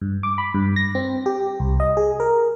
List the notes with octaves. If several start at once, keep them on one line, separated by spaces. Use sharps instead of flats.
G2
D6
B5
G2
A#6
C4
G4
C2
D#5
G#4
A#4